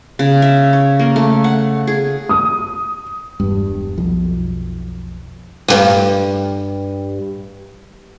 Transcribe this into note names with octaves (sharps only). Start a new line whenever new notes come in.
C#3
E5
C#5
A#3
A3
F#5
G#4
D#6
E1 G2
B1 F2
D2 G2